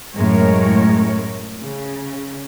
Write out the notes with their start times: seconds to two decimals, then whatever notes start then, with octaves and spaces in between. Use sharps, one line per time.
0.16 F#2 A2 G#3 A#4 C#5
1.60 C#3